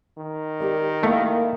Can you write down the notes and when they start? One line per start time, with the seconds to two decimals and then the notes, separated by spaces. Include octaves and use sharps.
0.18 D#3
0.60 G4 A#4 D5
1.03 A3 A#3 E4 A#4